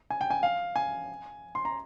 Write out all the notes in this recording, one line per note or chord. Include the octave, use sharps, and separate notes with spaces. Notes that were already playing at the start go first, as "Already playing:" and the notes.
G#5
G5
G#5
F5
G#5
C6
A#5